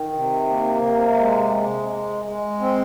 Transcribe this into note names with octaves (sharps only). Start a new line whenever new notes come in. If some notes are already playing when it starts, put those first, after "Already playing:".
Already playing: D#3
C3
A#3
C3
G#3
G#3
G#3
G#3
C4